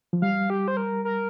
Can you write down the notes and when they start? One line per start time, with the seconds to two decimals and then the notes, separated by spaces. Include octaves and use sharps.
0.13 F3
0.22 G3 F5
0.50 G4
0.68 C5
0.77 A#4
1.05 A#4